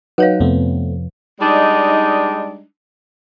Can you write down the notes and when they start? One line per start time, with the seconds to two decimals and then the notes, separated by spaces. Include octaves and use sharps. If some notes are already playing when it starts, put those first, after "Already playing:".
0.18 F#3 D#4 B4 C#5 F5 F#5
0.40 F2 C3 F3 A3 B3 C4
1.39 G3 G#3 D4 D#4